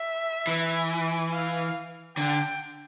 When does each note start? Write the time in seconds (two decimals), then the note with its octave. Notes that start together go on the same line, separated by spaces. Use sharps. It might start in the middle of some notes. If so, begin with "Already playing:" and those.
Already playing: E5
0.47 E3
1.32 F5
2.17 D3 G5